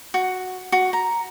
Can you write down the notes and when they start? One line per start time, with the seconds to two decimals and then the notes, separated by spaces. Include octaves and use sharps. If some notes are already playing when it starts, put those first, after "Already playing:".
0.14 F#4
0.72 F#4
0.93 A#5